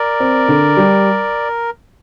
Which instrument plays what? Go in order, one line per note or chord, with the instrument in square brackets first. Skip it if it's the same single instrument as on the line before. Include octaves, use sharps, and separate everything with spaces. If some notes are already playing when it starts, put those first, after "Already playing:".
Already playing: [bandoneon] A#4 D5
[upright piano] C4
D3
G3